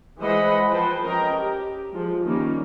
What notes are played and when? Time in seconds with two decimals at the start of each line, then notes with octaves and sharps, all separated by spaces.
0.19 E3 G#3 C5 D#5 F#5 B5
0.70 F3 B4 C5 G5 A5
1.03 C#4 A#4 D#5 G5 A#5
1.38 G4
1.93 F3 G#3
2.25 D#3 G3 A#3 C#4